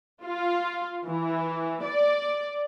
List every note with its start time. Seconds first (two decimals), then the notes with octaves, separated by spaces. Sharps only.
0.23 F4
1.09 E3
1.84 D5